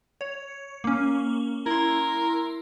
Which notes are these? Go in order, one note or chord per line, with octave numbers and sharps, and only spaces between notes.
C#5
A#3 C#4
E4 A#4 C6